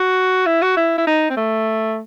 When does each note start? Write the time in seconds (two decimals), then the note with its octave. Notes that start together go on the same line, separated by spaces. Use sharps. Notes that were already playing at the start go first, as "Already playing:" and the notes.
Already playing: F#4
0.46 E4
0.62 F#4
0.77 E4
0.98 E4
1.07 D#4
1.30 C4
1.37 A3